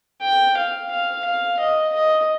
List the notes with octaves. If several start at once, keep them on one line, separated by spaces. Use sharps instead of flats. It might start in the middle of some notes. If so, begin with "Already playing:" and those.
G5
F5
F5
F5
D#5
D#5